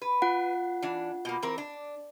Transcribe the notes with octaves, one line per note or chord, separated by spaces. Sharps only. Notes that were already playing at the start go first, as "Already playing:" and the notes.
B4
F4 F#5
E3 D4
B2 A#3
E3 C4 A#4
D4